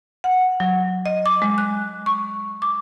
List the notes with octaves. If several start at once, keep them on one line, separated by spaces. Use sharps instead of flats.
F#5
F#3
D#5
D6
G#3
F#6
C#6
D6